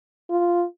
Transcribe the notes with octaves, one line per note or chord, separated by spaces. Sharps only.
F4